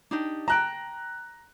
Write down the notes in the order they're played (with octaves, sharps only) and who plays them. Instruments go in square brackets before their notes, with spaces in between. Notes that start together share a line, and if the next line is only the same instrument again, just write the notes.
[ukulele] D4 D#4 G4
[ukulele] G5 A5 [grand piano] A#5 F#6